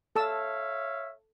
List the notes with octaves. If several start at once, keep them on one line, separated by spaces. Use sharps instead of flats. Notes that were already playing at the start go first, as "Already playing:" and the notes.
A4 C#5 E5 F5 A5 E6